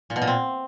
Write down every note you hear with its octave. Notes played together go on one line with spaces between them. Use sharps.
A#2
B2
A#2
C4